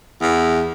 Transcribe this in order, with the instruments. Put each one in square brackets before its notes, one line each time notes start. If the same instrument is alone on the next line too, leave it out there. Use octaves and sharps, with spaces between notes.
[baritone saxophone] E2